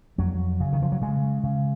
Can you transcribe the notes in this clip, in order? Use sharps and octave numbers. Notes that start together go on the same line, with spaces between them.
F2 F#3
C#3
D#3
F3
F#3
C#3 G#3
C#3